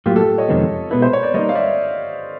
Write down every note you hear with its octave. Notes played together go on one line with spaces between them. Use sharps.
A2 F#3 A#3 F4 G4
G4 A4
C#5 D#5
F2 C3 D#3 G#3 B3
B2 G#3 B3 E4 B4
C5
C#5
D5
G3 A#3 D#4 C#5 D#5
F5
D5 E5